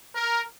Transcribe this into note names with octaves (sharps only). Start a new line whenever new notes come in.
A#4